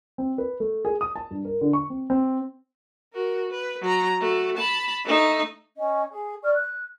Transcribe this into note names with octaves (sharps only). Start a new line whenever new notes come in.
C4
B4
A3
G#4
D#6
A5
G2
A#4
D3
C#6
C4
C4
F#4 A#4
B4
F#3 A#5
A3 F#4
A5 B5
A3 D#4
C#4 D#5
G#4
D5 C#6 F6
F#6